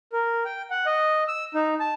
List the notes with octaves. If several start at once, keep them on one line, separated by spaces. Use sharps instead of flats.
A#4
G5
F#5
D#5
E6
D#4
A5